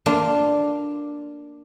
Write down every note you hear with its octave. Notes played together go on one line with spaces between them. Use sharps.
A#3 D4 F4